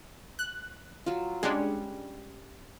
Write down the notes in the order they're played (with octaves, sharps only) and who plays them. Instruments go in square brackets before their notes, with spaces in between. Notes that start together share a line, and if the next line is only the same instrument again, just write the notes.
[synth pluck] F#6
[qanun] F#3 F4
[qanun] G3 C#4 F#5 [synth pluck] G#3 D4